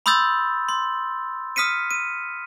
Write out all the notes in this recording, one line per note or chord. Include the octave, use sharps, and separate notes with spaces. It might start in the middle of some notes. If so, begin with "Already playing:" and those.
B5 C6 D#6 E6 G6 A6
C6
D#6 F6 B6 C#7 D#7
D#7